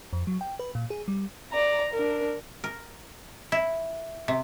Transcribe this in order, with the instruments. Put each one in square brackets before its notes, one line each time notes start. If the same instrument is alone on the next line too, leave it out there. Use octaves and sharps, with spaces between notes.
[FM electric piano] F2
F#3
G5
B4
A#2
G#4
G3
[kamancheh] D5 A#5
D4 A#4
[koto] A#4
E4
C3